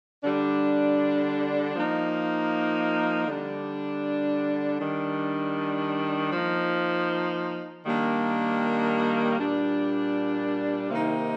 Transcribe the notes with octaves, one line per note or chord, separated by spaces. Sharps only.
D3 G3 D4
F3 A#3 D#4
D3 G3 D4
D#3 G3 D4
F3 A#3 D#4
D#3 G3 A#3 D4
A#2 G3 D4
C3 D#3 A#3 D#4